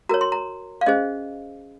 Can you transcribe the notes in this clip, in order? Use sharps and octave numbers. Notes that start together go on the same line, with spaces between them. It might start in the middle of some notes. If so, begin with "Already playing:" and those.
F#4 A#4 C#5 A#5
C6
A#5
F5
C#4 G#4 C5 D#5